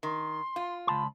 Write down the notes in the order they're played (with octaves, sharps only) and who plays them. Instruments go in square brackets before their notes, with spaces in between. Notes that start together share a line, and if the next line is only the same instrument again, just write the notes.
[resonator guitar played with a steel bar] D#3 [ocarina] C6
[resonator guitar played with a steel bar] F4
[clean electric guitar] C#2 A5 C6 [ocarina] B5